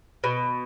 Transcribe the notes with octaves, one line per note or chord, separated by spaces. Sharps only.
B2